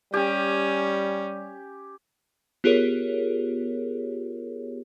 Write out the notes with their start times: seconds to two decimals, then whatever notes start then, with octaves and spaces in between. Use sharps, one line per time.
0.14 G3 C#4 G4 G#5
2.64 B3 F4 G4 G#4 A#4 C#5